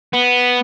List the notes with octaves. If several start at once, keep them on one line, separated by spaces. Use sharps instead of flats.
B3